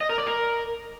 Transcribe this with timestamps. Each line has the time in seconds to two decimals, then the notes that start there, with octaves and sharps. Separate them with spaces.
0.01 D#5
0.09 A#4
0.18 D5
0.27 A#4